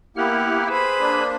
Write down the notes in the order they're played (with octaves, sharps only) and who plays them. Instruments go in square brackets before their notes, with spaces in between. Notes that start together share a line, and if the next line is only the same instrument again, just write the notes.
[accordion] A#3 E4 G4 [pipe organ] B3 F#5 F6
[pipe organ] G#4 B4 E6 [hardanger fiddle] C5 B5
[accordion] A#3 D4